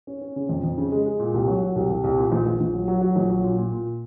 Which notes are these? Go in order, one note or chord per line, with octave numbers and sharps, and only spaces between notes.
C#4
C#4
C#3
F2
F2
C#3
G#3
G#3
A#2
C2
F#3
F#3
C2
C2
C2
A#2
A#1
A#1
A#1
F#3
F#3
F#3
A#1
F#3
A#2
A#2
A#2